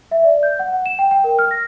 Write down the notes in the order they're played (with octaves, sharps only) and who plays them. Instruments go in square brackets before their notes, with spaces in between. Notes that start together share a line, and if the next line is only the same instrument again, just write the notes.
[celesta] E5
D5
G6
F#5
F#5
E7
G5
G5
A#4
F6
A#6